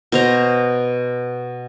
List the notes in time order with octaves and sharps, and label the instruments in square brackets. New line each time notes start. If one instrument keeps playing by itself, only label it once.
[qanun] B2 C5 A#5